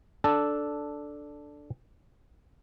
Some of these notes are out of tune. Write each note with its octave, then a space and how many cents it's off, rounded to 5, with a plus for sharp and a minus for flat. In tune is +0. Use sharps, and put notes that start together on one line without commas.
D4 +0 A4 +0